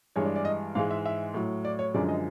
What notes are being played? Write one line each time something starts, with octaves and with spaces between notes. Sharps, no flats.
G2 E3 G#3 C#5
D5
D5
D#5
G#2 E3 G#3 F5
E5
E5
A2 F#3
D5
C#5
F#2 D3 F3 G#3 D5
D#5